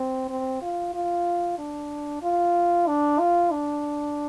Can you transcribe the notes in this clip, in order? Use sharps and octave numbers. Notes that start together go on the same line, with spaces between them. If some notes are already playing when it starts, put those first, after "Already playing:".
Already playing: C4
C4
F4
F4
D4
F4
D4
F4
D4